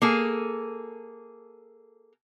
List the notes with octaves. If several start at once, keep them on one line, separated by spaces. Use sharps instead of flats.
A#3 G#4 A4